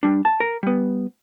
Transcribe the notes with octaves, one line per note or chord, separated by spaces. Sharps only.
G3 D4
A5
A#4
G3 B3